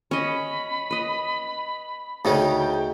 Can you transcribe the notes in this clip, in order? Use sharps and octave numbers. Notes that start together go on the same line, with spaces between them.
C#4 D#5 B5
B4 D#5
D2 C#3 C#4 D#4 G5